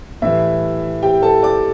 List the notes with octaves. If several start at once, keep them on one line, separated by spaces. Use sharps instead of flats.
A2 E3 G3 E4 E5
G4 G5
A4 A5
D5 D6